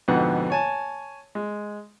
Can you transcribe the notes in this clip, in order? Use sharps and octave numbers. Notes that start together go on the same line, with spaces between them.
F2 G#2 B2 D3 B3 F#5
C#5 G#5 A5
G#3